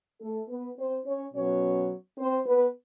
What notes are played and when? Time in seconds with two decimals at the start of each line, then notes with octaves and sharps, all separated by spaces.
0.20 A3 A4
0.49 B3 B4
0.77 C4 C5
1.05 C#4 C#5
1.33 B2 F#3 B3 C#4 C#5
2.18 C4 C5
2.46 B3 B4